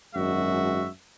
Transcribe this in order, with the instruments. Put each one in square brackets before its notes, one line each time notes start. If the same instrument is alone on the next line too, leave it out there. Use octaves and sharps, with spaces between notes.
[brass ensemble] G#1 F#2 G#3 F#4 E5